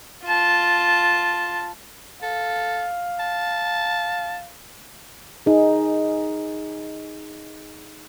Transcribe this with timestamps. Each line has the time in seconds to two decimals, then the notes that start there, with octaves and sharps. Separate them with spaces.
0.24 F4 A5
2.23 A4 F5
3.20 A5
5.46 D#4 G#4